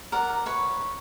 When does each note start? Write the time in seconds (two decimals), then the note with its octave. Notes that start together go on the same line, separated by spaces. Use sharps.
0.12 A#4 D5 F#5
0.46 B4 C#5 C#6